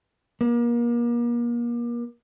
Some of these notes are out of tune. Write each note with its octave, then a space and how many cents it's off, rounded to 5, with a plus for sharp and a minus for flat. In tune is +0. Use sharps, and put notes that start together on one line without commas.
A#3 +35